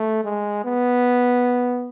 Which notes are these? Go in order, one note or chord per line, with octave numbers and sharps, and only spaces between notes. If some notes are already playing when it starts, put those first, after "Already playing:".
Already playing: A3
G#3
B3